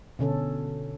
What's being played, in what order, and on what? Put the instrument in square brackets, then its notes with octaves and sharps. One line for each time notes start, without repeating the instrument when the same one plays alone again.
[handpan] B2 D3 C#4 A4